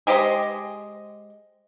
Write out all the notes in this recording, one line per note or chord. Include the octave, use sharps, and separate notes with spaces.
G#3 G4 C5 D#5